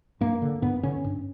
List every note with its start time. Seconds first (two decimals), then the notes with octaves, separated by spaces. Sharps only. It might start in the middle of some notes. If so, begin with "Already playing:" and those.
0.21 G2 A#3
0.42 D3
0.62 G2 B3
0.83 D3 C#4
1.04 G2